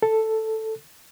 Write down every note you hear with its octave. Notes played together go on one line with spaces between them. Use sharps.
A4